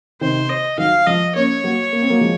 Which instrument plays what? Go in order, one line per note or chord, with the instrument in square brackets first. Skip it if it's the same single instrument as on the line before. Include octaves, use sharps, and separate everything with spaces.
[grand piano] C3 D#3 [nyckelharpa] C5
[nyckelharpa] D#5
[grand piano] D#3 F#3 [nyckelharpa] F5
[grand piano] F3 G#3 [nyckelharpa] D#5
[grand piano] A#3 C#4 [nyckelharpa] C#5
[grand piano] F#3 A#3
A#3
C4
F#3 A#3
F3 G#3